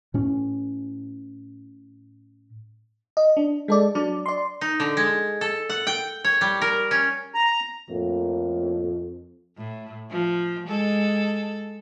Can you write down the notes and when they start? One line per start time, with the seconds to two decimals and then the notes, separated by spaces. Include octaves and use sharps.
0.14 A2 C#4
3.17 D#5
3.37 D4
3.68 G#3 A4 D5
3.95 F#3 D4 D5
4.26 D5 C6
4.61 D#4
4.80 D3
4.97 G#3
5.41 A4
5.69 F#5
5.87 G5
6.24 C#5
6.41 G3
6.62 A#4
6.91 C#4
7.34 A#5
7.90 F2 A2 A#3
9.57 A2
10.10 F3
10.67 G#3 A4